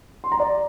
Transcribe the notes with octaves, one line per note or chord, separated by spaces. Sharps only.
C6
A#5
D5